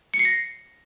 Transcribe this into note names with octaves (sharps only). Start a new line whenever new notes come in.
C#7
C7
A#6